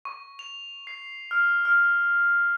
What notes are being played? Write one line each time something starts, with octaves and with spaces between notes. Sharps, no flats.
C#6
F7
C7
F6
F6